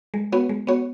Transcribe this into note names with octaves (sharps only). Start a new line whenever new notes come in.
G#3
B3 F#4 C#5
G#3
B3 F#4 C#5